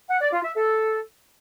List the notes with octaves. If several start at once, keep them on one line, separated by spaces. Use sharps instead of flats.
F#5
D5
F4
E5
A4